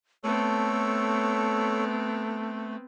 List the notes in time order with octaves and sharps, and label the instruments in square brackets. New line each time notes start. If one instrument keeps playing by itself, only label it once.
[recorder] A3 [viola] B3 C4 [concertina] A4 C#5